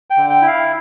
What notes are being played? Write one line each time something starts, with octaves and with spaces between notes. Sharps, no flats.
G5
D3
G5
E4
F5